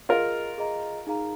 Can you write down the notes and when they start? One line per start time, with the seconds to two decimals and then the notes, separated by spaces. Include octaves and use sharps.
0.09 F4 G#4 A#4 D#5 A#5
0.58 G#4 D#5 A#5
1.07 D#4 G#4 F5 A#5